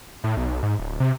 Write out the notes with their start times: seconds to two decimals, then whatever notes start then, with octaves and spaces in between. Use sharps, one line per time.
0.24 A2
0.37 B1
0.63 G#2
0.79 D1
1.00 C3